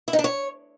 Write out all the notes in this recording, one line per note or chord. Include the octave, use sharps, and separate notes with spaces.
E4
D#4
D4
C#5